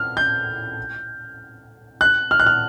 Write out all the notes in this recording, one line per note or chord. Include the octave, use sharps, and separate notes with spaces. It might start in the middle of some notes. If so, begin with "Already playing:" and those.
Already playing: F6
G6
F#6
F6
F#6
F6